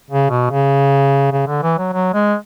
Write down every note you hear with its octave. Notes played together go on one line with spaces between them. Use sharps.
C#3
B2
C#3
C#3
D3
E3
F#3
F#3
G#3